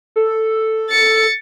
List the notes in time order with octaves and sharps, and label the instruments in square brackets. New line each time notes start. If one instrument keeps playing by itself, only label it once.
[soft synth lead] A4
[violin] A6 C#7